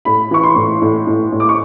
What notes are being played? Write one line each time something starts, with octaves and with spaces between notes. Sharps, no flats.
A2 B5
E3 C#6
C6
A2
A2
A2
A2
D6
C#6